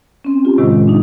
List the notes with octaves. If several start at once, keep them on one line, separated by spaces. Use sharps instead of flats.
C4 C#4
F4 G4
A2 C3 D#3 G#3
D4 D#4